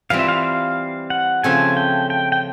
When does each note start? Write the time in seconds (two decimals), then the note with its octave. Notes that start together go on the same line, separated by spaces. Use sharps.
0.10 E3 G3 C4 F4 F5
0.19 E5
0.28 F5
0.43 F5
1.10 F#5
1.43 C#3 F3 A3 C4 G#5
1.77 G5
2.10 G5
2.32 G5